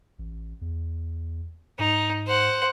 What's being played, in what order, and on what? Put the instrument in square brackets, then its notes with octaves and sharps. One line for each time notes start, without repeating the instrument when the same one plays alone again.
[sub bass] A1
E2
[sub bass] G#2 [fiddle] D#4
[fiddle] C5 F#5